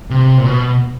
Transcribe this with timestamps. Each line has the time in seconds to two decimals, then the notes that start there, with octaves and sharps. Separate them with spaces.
0.10 C3
0.38 A#2
0.45 B2